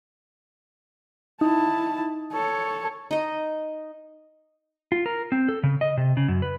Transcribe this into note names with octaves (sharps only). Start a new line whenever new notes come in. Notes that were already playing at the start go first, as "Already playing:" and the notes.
D#4 E4 A5
A4 C#5
D#4 D#5
F4
A#4
C4
A4
C#3
D#5
C3
C#3
F#2
B4